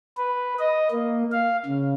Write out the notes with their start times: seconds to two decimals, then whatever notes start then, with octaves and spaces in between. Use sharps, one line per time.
0.17 B4
0.59 D#5
0.91 A#3
1.32 F5
1.65 C#3